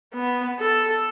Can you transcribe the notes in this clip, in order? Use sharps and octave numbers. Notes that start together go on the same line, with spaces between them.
B3
A4